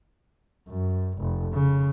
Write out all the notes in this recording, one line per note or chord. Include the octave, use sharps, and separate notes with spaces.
F#2
F1
C#3